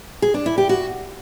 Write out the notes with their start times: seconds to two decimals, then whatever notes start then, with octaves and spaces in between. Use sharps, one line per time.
0.22 G#4
0.34 D4
0.46 E4
0.58 G4
0.69 F#4